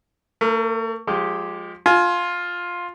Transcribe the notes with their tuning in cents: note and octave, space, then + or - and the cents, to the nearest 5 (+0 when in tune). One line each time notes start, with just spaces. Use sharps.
A3 +40 A#4 +0
F3 +30 G#3 +0 G4 +0
F4 +10 G#5 +35